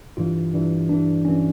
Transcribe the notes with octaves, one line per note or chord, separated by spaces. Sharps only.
G2 E3 F4
G2 E3
G2 E3 D4
G2 E3 C#4